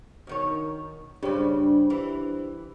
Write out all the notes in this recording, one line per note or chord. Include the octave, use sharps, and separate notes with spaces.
B2 D#3 C#5
G2 C#3 D4 G4 C5
E3